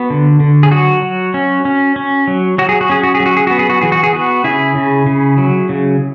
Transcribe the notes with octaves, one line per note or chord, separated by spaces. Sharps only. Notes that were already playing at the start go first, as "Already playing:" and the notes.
Already playing: B3 F#4
D3
D3
G#4
F#3 F#4
F#3
C#4
C#4
C#4
F#3
F#3 F#4
G#4
F#4
C#4 G#4
F#4
G#4
F#3
F#4
G#4
B3 F#4
G#4
F#4
E3 G#4
F#4
G#4
B3 F#4
C#3 E4 G#4
C#3
C#3
F#3
C#3